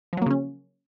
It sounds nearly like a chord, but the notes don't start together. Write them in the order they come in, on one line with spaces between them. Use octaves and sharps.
F3 F#3 A#3 C#3 C#4